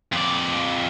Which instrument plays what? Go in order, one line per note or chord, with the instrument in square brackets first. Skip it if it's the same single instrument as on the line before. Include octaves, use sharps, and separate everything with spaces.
[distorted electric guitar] F2 D5